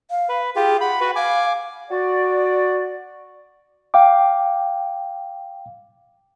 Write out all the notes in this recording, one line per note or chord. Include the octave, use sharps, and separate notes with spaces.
F5
B4
F4 G4 G#4
F#5 B5
F#4 B4
F5 G#5 D6
F#4 D5
F5 G5 D6